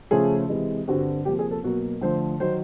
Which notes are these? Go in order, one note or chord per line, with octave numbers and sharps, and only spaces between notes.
C#3 F3 A3 C#4 F4 G#4
C3 E3 G#3
G2 D3 G3 C4 F#4
C3 F3 A#3 G4
G#4
A4
B2 F#3 A#3 F#4
D3 F3 A3 C5
D#3 F#3 C5